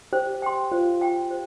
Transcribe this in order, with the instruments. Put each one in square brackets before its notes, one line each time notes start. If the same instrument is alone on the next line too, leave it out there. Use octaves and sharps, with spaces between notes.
[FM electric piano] G4 [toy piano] C5
[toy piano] G5 C6
[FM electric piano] F4 [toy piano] C5
[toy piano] G5 C6
C5